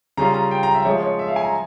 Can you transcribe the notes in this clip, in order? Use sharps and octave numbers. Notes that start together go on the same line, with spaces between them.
C#3 G3 C#4 F4 A#5
A#5
G5
A#5
E5
F3 G#3 C#4 F4 C#5
C#5
E5
F5
G#5
A#5